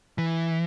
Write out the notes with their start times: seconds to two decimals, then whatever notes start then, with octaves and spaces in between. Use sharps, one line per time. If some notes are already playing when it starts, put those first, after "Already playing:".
0.18 E3